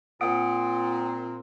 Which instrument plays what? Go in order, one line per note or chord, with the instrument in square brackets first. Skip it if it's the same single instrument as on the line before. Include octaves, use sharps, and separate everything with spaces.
[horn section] A#2 C4 [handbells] F#5 D#6 D7